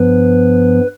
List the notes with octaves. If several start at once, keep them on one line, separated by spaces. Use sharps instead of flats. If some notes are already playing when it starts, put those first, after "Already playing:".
Already playing: G2 F3 B3 B4